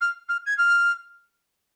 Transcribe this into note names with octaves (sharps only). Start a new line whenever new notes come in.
F6
F6
G#6
F6